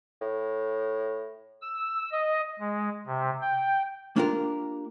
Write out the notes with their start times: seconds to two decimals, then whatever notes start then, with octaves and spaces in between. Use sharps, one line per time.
0.21 A2
1.62 E6
2.12 D#5
2.59 G#3
3.07 C3
3.41 G5
4.16 A#3 D4 F4 G4 A#4